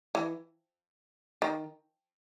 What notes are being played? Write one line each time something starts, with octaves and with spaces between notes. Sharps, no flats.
E3
D#3